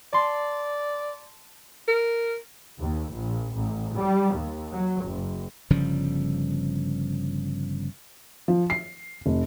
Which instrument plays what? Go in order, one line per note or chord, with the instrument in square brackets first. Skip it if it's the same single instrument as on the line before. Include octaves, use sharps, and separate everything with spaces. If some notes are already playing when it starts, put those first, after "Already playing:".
[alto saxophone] D5 [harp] A5 C6
[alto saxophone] A#4
[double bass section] D#2
A#1
A1
G3
D#2
F#3
F#1
[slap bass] G1 C#3 F3 G3
[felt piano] F3
C7
F1